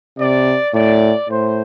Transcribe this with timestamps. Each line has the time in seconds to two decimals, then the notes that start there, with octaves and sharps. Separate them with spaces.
0.18 C3 D5
0.74 A2 D5
1.29 A2 C5